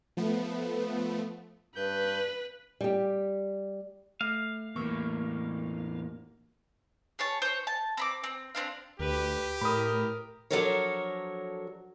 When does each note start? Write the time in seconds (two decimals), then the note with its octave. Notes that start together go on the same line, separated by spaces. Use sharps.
0.17 F3 A3 B3
1.76 G2 B4 G6
2.81 G3 G4
4.21 A3 F5
4.76 E2 A2 A#3 C#6 E6
7.19 G#4 C#5 A5
7.42 C5 C#5
7.67 A5
7.97 C4 B5 D6
8.24 C4
8.55 C4 D4 F5
9.00 D2 G4 B4
9.61 A2 A#4 B5 D#6
10.51 F3 F#3 D4 A4 A#4 C#5